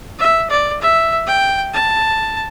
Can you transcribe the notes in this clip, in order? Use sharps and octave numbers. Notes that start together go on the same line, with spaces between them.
E5
D5
E5
G5
A5